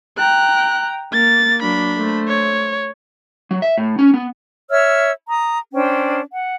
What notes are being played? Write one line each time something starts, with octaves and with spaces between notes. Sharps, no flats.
G5 A#5 F#6
A#3 A6
F#3 A#3 D4 B5
A3 C5
C#5
F#3
E5
A2
C#4
B3
C#5 E5 E6 F6
A#5 D#6
C#4 D4 C5 G5
F#5